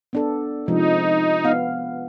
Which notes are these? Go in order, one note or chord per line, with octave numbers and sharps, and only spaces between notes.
B3 D4 A4
C3 F3 G#3 D#4
B3 F5